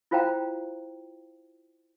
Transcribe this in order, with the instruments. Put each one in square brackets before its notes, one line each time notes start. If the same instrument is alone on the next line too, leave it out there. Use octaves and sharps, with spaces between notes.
[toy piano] E4 F4 C5 F5 G5 A#5